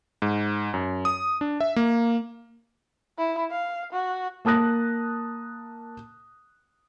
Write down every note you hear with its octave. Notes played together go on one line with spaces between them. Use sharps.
G#2
F#2
D#6
D4
E5
A#3
E4
F5
F#4
A#3 A5 D#6 F#6 A#6